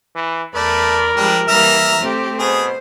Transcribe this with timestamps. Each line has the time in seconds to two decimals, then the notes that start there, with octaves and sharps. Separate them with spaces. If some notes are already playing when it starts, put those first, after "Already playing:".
0.16 E3
0.55 E2 A3 A#4 D5 B5
1.17 F3 G3 G#3 D4 G4
1.48 E3 G3 A#3 E5 A#5 F6
2.00 A3 C4 G4
2.39 B2 G#4 C5